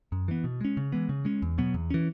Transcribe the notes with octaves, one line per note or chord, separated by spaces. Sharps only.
F#2
E3 B3
B2
G#3 C#4
C#3
E3 G#3 B3
C#3
G#3 C#4
E2
B2 F#3 B3
E2
E3 C#4